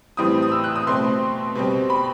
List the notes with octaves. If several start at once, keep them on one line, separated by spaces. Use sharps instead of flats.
A2 E3 G3 C4 D#6
D#6
E6
F#6
D#6
B2 A3 C4 C6
B2 G3 C4
B5